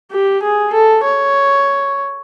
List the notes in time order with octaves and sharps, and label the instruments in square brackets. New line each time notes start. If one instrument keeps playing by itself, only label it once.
[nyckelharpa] G4
G#4
A4
C#5